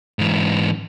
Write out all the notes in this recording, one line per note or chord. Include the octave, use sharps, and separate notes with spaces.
G#2 E3